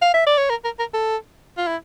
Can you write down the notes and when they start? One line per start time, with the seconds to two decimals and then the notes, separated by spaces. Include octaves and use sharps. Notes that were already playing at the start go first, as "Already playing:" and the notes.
0.02 F5
0.14 E5
0.26 D5
0.38 C#5
0.50 A#4
0.64 A#4
0.79 A#4
0.94 A4
1.57 F4
1.67 E4